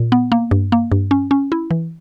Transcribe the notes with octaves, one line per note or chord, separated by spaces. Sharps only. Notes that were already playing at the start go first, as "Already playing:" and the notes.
Already playing: A#2
B3
A#3
G2
A#3
G2
C#4
C#4
E4
E3